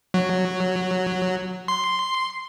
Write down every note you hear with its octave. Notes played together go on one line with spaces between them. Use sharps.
F#3
C6